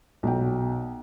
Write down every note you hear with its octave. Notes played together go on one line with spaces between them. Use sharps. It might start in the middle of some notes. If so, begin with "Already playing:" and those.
B1 G5